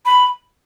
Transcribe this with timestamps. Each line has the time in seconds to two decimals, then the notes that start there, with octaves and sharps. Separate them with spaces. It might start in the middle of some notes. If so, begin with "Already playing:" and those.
0.06 B5